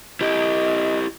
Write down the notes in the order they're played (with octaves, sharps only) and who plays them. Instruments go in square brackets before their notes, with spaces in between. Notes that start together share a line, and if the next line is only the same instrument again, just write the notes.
[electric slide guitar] E4 G4 [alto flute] D#5